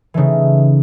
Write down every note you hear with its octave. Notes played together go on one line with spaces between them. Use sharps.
C#3 E3 A3 D#4